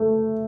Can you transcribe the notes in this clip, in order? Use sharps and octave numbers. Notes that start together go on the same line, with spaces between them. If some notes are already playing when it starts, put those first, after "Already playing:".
Already playing: A3